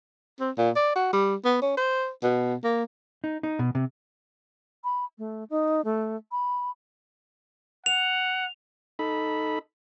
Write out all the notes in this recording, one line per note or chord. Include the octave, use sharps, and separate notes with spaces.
C4
A#2
D5
F#4
G3
B3
C#4
C5
B2
A#3
D#4
D#4
B2
C3
B5
A3
D#4
A3
B5
F#5 F7
D#4 A4 B5